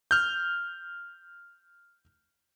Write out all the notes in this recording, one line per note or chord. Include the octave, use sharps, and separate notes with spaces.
F6 G6